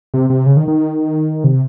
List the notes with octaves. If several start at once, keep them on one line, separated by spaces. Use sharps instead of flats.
C3
C3
C#3
D#3
D#3
C3